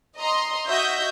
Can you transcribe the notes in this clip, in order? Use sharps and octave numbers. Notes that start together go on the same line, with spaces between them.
D#5 A#5 C6
F#4 D#5 E5 G6 A#6